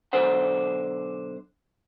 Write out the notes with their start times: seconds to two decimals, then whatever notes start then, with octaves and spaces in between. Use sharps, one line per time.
0.13 B1 D3 C5 F#5